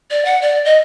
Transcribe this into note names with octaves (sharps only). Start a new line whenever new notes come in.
D5
F#5
D5
D#5